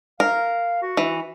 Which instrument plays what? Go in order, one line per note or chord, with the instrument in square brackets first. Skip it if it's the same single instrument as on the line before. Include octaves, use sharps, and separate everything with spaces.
[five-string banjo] A#4 [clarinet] F5
[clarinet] F#4
[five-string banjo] E3